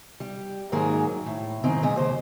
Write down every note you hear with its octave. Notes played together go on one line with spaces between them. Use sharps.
G3
G#2 D#3 F#3 A#3 G#4 A#4
A2
G#2 D#3 F#3 C4 D#4
A#2 C#3 G#3 D#5
D#2 C5